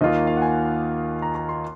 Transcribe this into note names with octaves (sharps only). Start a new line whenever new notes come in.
D#2 D#3 A#3 F4 D#5
F5
F#5
G#5
A#5
A#5
C6